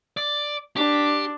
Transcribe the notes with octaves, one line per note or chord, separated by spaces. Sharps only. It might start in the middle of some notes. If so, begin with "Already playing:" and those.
D5
D4 G4